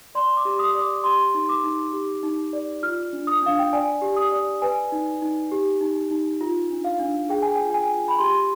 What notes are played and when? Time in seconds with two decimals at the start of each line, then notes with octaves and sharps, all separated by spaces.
0.15 D5 C6
0.37 D6
0.45 G4
0.59 D#6
0.74 D5
0.81 D6
1.04 G4 C6
1.34 D#4
1.49 D6
1.64 D#4
1.93 G4
2.23 D#4
2.53 D5
2.83 F4 F6
3.13 D4
3.27 D#6
3.43 D4 F5
3.59 G5
3.73 D5 G#5
4.02 G4
4.16 D#6
4.32 D5
4.62 B4 G#5
4.92 D#4
5.22 D#4
5.52 G4
5.81 D#4
6.11 D#4
6.41 F4
6.71 D4
6.84 F5
7.00 D4
7.29 G#4 G5
7.42 G#5
7.55 F4 G5
7.70 G5
7.74 G#5
7.89 F4
8.08 B5
8.19 G4 C6